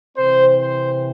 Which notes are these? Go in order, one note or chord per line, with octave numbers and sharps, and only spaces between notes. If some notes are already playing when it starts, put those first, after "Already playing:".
C3 E3 C4 C5
C5